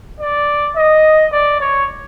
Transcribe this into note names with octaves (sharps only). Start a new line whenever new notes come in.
D5
D#5
D5
C#5